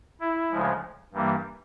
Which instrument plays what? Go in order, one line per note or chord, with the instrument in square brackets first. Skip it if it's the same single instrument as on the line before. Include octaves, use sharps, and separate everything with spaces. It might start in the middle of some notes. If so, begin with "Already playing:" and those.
[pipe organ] E4
D2 C#3 F3 G#3
G2 E3 G3 A#3